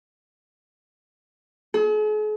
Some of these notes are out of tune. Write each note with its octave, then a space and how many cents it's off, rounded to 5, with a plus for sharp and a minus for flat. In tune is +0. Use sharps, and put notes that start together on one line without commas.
G#4 +45